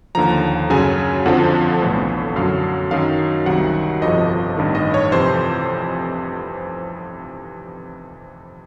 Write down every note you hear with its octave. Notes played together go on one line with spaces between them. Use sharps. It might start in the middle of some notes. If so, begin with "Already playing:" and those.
D#2 D3 F3 A#5
F#2 C#3 F#3 G#5
F2 D3 F3 F#5
B1 A2 E3
F#2 D3 F#3 F5
F#2 D#3 F#3 F5
C2 C3 D#3 F#3 F#5
G1 F2 C3 F3 D#5
A1 G2 D#3
D#5
C#5
F2 C3 E3 C5